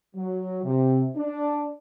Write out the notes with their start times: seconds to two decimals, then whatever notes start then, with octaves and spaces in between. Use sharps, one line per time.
0.16 F#3
0.64 C3
1.16 D4